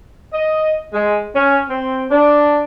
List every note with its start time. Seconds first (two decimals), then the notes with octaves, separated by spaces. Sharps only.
0.34 D#5
0.94 G#3
1.36 C#4
1.69 C4
2.11 D4